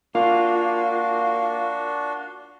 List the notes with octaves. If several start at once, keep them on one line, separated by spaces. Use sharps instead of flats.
A#3 D4 F4 F#4